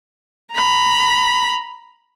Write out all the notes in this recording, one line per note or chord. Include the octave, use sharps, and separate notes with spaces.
A#5 B5